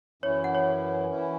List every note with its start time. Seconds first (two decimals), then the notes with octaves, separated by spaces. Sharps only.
0.22 F#2 E3 C#4 E4 C#5
0.44 F#5
0.55 C#5
1.09 E3 C#4 E4